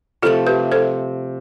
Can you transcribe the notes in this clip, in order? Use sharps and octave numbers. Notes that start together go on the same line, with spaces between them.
C3 F3 A3 F4 A4
G4 B4
A4 C5